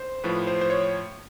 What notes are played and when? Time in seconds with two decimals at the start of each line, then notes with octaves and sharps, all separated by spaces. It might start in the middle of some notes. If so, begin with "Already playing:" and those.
Already playing: C5
0.24 A2 F3 B4
0.47 C5
0.61 C5
0.70 C#5